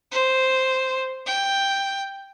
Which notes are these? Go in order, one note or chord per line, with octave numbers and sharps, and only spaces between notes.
C5
G5